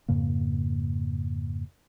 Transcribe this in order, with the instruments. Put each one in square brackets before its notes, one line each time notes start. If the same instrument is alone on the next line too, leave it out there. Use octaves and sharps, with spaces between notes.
[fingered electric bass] F2 G#2 C#3 A#3